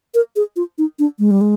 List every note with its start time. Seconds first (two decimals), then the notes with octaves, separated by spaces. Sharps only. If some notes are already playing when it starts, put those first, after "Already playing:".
0.14 A#4
0.36 G#4
0.56 F4
0.78 D#4
0.99 D4
1.19 G#3
1.31 G3
1.41 G#3